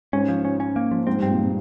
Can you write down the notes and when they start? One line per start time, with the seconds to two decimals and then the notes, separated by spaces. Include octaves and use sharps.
0.13 G#2 C#4
0.28 F3
0.45 C#4
0.60 C#4
0.76 A#3
0.91 F3
1.07 G#2 C4
1.19 G2 C4
1.30 A#2
1.42 A#2